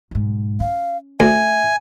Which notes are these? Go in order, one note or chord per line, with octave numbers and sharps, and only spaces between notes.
B1 G#2
C#4 F5
D2 E5 G#5